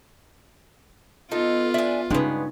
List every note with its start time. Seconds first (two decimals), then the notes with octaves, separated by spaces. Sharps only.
1.32 B3 D#4 F4 A4
1.74 D4 E5 G#5
2.11 G2 C#3 G#3 B3 D#4